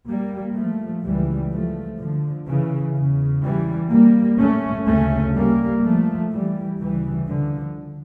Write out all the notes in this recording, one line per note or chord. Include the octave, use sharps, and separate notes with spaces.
G3 A#3
F3 A3
C#2 C#3 E3 G3
F3 A3
D3 F3
C#3 E3
E2 C#3
E3 G3
G3 A#3
A3 C#4
D2 C#3 A3 C#4
G3 A#3
F3 A3
E3 G3
D2 C#3 E3 G3
D3 F3